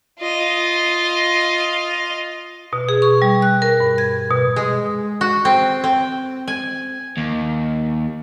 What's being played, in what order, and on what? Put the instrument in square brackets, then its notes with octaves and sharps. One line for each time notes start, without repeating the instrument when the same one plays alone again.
[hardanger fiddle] F4 D#5
[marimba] B2
G#4
C#6
G3
F#6
A#4
G2
G#6
B2
[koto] G#3
F#4
C4
C4
G#5
[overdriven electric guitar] D#2